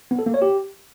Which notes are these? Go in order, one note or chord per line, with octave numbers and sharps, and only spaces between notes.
B3
A4
A#3
C#5
G4